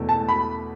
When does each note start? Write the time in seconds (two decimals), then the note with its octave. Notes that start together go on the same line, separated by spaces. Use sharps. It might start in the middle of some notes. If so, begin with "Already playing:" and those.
Already playing: E2 B2 A3
0.09 A5
0.29 B5